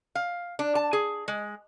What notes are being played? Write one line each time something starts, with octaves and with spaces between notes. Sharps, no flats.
F5
D4
A5
G#4
G#3